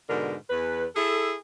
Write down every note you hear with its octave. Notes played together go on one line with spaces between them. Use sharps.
G#2 B2 D3 A#4
E2 B4
E4 G#4 A4